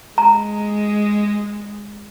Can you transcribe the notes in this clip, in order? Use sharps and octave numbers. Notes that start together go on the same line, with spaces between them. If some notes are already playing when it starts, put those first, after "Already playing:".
G#3 A#5